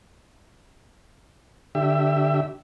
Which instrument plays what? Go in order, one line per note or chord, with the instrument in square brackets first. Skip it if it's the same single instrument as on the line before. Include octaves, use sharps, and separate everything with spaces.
[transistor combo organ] D3 G4 E5